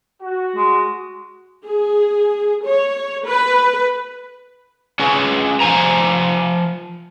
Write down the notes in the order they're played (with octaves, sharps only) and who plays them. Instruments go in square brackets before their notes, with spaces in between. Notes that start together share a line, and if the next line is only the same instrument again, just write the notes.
[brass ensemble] F#4
[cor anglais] G#3
[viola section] G#4
C#5
B4
[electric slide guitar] C#4 G#4 B4
F3 C5 G#5 A#5